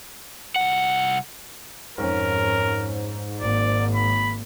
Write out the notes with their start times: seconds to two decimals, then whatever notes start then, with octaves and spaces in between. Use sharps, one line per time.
0.56 C2 F#5
1.98 F2 G#2 C#4 A#4
3.41 G#1 A#3 D5
3.95 B5